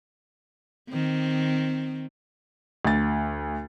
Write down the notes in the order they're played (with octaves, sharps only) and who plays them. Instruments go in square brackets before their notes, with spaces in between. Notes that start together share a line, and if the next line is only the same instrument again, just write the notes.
[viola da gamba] D#3 C4
[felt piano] D2 A6